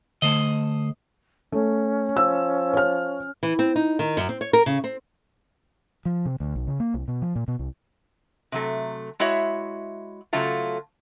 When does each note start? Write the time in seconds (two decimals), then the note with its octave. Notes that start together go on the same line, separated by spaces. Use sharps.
0.22 D3 A3 C5 D#5
1.52 A3 C#4
2.17 F3 E6
2.73 C#5 F6
3.43 E3
3.59 C4
3.76 D#4
3.99 D#3
4.17 F#2
4.29 C4
4.41 C#5
4.53 A#4
4.66 C#3
4.84 C4
6.05 F3
6.26 C3
6.40 D2
6.55 B1
6.67 C#3
6.80 A#3
6.94 C2
7.08 B2
7.22 F3
7.36 A#2
7.48 B2
7.59 C2
8.52 C3 F#3 A3
9.20 G#3 E4 F#4 C#5 E5
10.33 C#3 F#3 A3 F4 A4